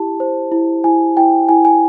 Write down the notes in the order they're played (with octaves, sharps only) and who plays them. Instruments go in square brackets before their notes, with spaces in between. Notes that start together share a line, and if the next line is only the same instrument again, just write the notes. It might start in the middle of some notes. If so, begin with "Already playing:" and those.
Already playing: [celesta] E4 G4 A5
C5
E4
E4 G#5
E4 G5
E4 G#5
G#5